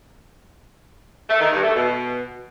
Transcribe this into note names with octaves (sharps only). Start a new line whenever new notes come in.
A3
D#3
G2
A3
B2